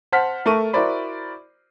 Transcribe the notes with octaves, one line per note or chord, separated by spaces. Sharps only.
C5 F#5 A5 F6 B6
A3 A#4 A5 A#5 C#6 D#7
E4 F#4 A#4 C5 D5 B5